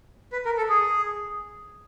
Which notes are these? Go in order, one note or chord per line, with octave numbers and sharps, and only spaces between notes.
B4
A#4
A4
G#4